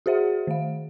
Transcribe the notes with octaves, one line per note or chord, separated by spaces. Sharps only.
F#4 G#4 C5 E5 F#5
D#3 F5